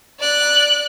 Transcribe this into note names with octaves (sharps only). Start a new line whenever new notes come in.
D5 F#6